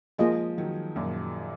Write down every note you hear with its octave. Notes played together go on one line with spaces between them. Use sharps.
F3 G#3 A#3 F4 G#4 D#5
D#3 F#3
F#2 A#2